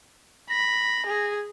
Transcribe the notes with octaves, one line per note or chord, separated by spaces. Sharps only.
B5 A#6
G#4